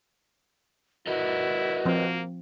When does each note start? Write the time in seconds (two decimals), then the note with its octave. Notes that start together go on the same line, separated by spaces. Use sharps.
1.07 E4 F#4 A#4 B4 D#5
1.85 F3 A#3 C4